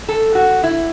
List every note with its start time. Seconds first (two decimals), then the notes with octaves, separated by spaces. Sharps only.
0.08 A4
0.35 F#4
0.63 E4